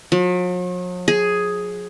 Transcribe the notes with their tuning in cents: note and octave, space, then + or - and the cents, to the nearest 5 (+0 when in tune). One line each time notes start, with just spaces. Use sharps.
F#3 -45
G#4 +5